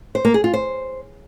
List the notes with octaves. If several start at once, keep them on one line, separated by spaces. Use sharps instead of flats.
C5
A#3
G#4
F4
C5